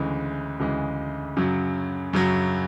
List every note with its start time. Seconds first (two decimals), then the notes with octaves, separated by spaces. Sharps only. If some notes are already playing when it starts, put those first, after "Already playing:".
Already playing: D2 C#3 E3 G#3
0.59 D2 C#3 E3 G#3
1.36 F#2 C#3 F#3
2.13 F#2 C#3 F#3